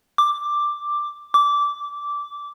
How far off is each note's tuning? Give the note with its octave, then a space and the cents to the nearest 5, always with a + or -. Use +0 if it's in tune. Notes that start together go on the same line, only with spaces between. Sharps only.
D6 +5
D6 -15